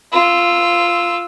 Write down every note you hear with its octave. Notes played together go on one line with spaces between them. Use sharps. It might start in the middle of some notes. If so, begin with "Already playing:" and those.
F4 E6